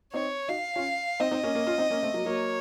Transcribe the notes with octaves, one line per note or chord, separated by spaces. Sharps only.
C4 D#4 C#5
D#4 F#4 F5
C#4 F4
C4 D#4 D#5
C4 D#4
A#3 C#4
A#3 C#4
C#4 F4
C4 D#4
A#3 C#4
A3 C4
F#3 A#3
F#3 A#3 C#5